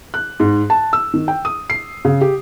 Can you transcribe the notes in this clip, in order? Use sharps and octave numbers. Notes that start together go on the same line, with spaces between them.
F#6
G#2
A5
E6
D#3
G5
D#6
C7
C#3
G4